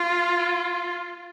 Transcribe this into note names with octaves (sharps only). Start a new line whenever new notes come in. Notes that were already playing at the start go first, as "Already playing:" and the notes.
Already playing: F4